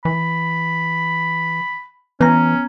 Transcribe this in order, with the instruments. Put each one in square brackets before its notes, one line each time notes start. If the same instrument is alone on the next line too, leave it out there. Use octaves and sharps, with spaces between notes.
[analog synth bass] E3 [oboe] B5
[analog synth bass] E3 [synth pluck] B3 A#5 [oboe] C#4